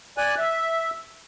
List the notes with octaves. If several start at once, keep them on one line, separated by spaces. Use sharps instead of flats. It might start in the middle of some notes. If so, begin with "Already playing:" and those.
D5 G#5 F#6
E5